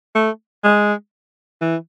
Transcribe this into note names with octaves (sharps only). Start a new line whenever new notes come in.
A3
G#3
E3